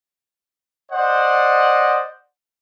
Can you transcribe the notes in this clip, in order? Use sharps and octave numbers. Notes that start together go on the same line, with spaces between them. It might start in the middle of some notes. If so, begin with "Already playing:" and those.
C5 D5 D#5 F#5